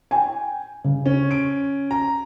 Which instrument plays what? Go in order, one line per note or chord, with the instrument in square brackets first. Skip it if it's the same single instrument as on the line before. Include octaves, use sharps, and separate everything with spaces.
[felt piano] G5 G#5
C#3
[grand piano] C#4
[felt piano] D7
[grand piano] A#5